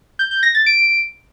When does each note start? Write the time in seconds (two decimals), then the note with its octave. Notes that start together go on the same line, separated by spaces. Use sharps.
0.19 G6
0.31 G6
0.43 A#6
0.55 A6
0.66 D7